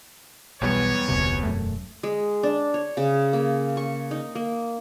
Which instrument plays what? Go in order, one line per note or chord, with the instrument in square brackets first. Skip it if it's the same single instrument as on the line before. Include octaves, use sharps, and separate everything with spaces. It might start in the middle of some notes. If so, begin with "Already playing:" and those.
[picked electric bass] B1 [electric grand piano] E2 G3 B3 [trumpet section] C#5
[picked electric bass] F1 D2 C3
E1 F#2 A3
[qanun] G#3
D4
C#5
C#3
A#3
C#6
D#4
A#3